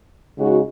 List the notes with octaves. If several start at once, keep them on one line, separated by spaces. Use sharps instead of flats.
C#3 G#3 D#4 F#4